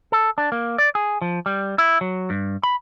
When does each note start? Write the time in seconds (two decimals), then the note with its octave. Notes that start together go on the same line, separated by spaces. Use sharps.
0.12 A4
0.38 D4
0.52 A#3
0.78 D5
0.95 G#4
1.22 F3
1.46 G3
1.78 E4
2.01 F#3
2.30 G2
2.63 B5